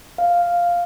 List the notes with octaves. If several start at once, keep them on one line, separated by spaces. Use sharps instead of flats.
F5